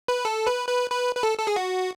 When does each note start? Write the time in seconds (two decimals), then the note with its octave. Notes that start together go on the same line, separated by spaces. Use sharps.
0.08 B4
0.25 A4
0.47 B4
0.69 B4
0.90 B4
1.15 B4
1.23 A4
1.38 A4
1.47 G#4
1.56 F#4